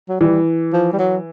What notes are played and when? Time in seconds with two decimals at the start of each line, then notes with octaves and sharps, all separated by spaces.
0.09 F#3
0.21 E3 G3
0.73 F3
0.93 G3
0.99 F#3